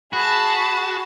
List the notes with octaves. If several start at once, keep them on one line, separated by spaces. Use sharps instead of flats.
F#4 G#4 A5 B5